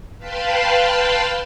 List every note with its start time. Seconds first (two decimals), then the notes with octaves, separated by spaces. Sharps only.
0.19 B4 F5 G5 A5 B5 C6